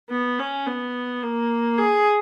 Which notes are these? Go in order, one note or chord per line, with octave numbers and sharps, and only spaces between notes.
B3
C#4
B3
A#3
G#4